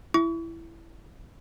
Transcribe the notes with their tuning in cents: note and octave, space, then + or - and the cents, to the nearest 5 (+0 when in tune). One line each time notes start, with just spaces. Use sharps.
E4 +10 C#6 +40